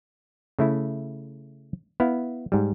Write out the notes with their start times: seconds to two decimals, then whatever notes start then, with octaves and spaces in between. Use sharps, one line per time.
0.59 C#3 A3 E4
2.00 B3 E4 F5
2.52 G#2 G3